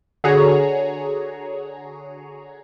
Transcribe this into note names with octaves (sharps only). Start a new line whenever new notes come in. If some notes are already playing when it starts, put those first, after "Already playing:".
D3 F#4 G#4 C#5 A#5